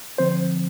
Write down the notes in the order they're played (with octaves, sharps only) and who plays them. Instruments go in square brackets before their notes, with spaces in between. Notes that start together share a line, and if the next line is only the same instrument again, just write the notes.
[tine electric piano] D3 F3 C4 C5